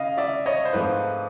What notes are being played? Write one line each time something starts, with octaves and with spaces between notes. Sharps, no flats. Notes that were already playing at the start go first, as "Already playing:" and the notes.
Already playing: C#3 D#5 F5
D5 E5
C#5 D#5
C5
G#2 F3 A3 C4 B4